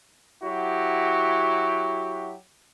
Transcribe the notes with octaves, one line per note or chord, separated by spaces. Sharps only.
F#3 E4 F#4 G4